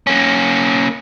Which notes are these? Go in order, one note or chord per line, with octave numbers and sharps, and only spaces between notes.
A#3 C#4